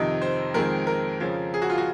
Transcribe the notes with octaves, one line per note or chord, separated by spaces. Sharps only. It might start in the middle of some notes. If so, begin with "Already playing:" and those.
Already playing: F2 C3 D#3 D#5
C5
F2 D#3 G#3 C4 A#4
A#4
F2 C#3 F3
G#4
F#4
F4
F#4